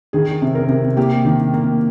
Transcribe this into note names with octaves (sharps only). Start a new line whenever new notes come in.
D#3 G#4
C3
A#4
C3
A#3 G4
D#3
A#3